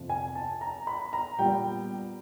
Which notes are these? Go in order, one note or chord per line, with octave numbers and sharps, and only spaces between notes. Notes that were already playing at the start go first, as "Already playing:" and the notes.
Already playing: F2 C3 F3
G#5
A5
A#5
B5
A#5
A#2 G3 B3 G5